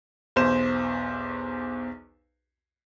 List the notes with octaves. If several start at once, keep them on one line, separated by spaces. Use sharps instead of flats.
B1 E2 C5 E7